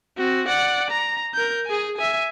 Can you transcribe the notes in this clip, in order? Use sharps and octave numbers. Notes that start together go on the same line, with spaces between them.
C4 F#4
D5 F#5
A#5
A#4 G6
G#4 G#5
E5 G#5